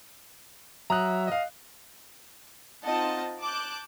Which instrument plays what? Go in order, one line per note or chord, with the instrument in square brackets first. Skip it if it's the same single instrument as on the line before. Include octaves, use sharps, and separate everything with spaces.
[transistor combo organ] F#3 E5 [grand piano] A#5 D#6 F#6
[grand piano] D#5 F5
[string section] C4 D#4 F4 D#5 F#5 A5
A5 D6 F#6 G6